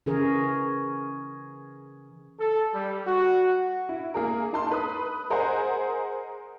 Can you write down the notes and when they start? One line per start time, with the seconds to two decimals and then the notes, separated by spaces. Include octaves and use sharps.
0.06 C#3 E3 C#4 G#4 A#4
2.40 A4
2.74 G3
3.07 F#4
3.89 E4
4.14 A#3 G#4 A#4
4.53 D#4 A5 C6
4.71 B4 D#6
5.30 G#4 A#4 C5 D#5 F#5 G#5